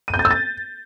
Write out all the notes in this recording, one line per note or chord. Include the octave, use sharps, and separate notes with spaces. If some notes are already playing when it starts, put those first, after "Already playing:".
D#7
G6
A6
E6
A6